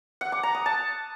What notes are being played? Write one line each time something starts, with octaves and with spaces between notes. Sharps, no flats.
F#5
D6
A#5
D#6
A5